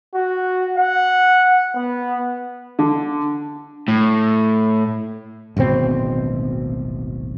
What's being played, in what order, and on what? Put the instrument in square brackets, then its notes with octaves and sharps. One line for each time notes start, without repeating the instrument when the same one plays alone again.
[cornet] F#4
F#5
B3
[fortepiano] D3
[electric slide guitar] A2
[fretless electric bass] D1 G#1 B2 C4